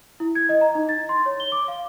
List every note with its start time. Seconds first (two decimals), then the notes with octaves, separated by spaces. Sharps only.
0.20 E4
0.35 G#6
0.49 D#5
0.61 A#5
0.75 D#4
0.89 A6
1.09 C6
1.26 C#5
1.40 G7
1.52 D6
1.68 F5